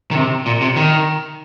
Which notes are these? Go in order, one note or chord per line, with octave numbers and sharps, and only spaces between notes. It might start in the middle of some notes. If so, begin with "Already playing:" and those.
D#3
C3
A#2
C3
D#3